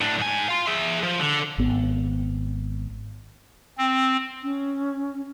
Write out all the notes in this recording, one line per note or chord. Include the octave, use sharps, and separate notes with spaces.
A2 D4
G#2 G#5
F5 C6
G#4 E5
F3
D3
G#1 B3
C4
C#4